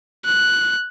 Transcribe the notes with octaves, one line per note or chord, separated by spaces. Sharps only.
F#6